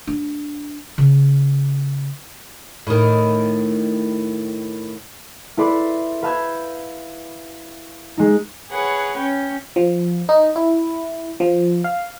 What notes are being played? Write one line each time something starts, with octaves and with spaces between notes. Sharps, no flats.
D4
C#3
A2 D#3
E4 A4 B4 D5 C6
B4 F5 A5 E6 G6 G#6
G#3 D#4
G#4 B4 C#5 F#5
C#4 G5
F3
D#4
E4
F3
F5